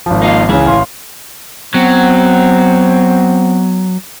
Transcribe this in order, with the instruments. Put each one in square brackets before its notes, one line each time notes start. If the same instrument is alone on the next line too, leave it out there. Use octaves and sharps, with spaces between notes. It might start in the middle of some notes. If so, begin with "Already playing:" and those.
[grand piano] G#1 F3
[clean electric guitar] A#3 D#4 F4
[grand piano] C#2 C#3 [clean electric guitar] E3 G#4
[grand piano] A1 F5 C6
[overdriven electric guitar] F#3 [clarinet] B3 [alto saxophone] C4